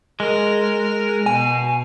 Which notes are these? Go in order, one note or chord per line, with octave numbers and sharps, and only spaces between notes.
G#3 A#4
B2 G#5